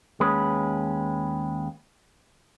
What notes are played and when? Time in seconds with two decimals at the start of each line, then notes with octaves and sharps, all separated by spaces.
0.20 D#2 G#3 C#4 B4